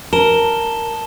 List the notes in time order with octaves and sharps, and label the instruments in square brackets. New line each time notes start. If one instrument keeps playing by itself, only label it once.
[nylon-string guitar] A#4 [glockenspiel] A5 E7 G7